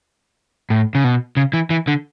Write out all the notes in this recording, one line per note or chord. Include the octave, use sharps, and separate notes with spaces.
A2
C#3
B2
C#3
E3
E3
D3